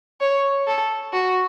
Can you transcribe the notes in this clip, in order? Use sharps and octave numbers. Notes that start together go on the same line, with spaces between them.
C#5
A4
F#4